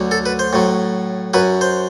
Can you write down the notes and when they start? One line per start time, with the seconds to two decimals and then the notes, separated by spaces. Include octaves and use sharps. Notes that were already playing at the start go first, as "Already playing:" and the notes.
Already playing: D2 D3 F#3
0.11 A4
0.26 B4
0.39 C5
0.53 A2 F#3
1.34 F#2 F#3 B4
1.61 C5